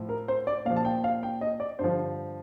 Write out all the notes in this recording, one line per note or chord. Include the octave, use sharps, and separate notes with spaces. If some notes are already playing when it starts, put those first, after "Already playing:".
Already playing: A2 F3
A#4
C5
D5
A#2 F3 F5
A5
G5
F5
G5
D#5
D5
G2 D3 F3 C5